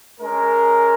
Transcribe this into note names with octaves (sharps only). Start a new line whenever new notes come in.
G#3 C#4 A#4